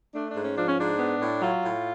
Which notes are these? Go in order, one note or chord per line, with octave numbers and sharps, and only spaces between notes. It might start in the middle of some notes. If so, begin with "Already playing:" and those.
A3 D4
D4
G#2
C#4
F3 D4
C#4
G#2 D4
B3
A2
F#3 F4
A2